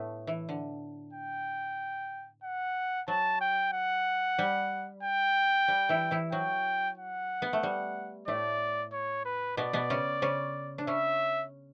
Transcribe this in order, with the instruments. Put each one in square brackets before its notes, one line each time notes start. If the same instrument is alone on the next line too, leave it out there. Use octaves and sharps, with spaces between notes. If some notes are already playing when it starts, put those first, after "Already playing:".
Already playing: [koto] A2 A3 B3
E3
D3
[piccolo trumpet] G5
F#5
[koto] F#3 [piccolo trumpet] A5
[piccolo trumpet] G5
F#5
[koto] G3
[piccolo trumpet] G5
[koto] G3
E3 E4
E3 E4
[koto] F#3 [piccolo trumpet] G5
[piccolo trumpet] F#5
[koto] B3
A3
G3
[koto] A2 A3 [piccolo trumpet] D5
[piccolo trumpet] C#5
B4
[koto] B2 B3 [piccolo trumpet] D5
[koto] B2 B3
C#3 C#4
C#3 C#4
D4
[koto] C#3 C#4 [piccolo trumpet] E5